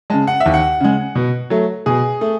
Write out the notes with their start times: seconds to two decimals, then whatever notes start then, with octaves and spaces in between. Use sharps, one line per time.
0.10 C#3 G#3 A5
0.27 F#5
0.40 E5
0.46 D#2
0.54 F#5
0.80 C#3 G#3
1.15 B2
1.50 F#3 A3
1.86 B2 G#4
2.21 A3